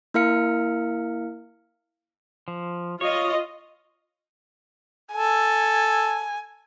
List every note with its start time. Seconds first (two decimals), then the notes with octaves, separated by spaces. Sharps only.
0.14 A#3 E4 A#4 F5 F6 C#7
2.48 F3
3.01 F4 C#5 D#5
5.12 A4 G#5